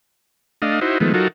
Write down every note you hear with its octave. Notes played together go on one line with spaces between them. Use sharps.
A3 D4 D#5 F5
D#4 E4 F#4 C5
D#3 F3 G#3 A3 B3
F#3 D#4 F4 F#4 A4 A#4